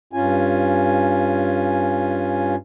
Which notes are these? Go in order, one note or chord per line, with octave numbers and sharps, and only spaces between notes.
G2 C#4 F4 G#5